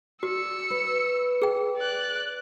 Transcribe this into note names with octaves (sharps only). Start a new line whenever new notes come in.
F#4 D5 E6 C#7
B4 C#5
G#4 G5
D5 F#6